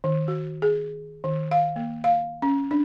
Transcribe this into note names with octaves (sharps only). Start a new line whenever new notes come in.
D#3
F#4
G#4
D#3
F5
A#3
F5
C#4
D4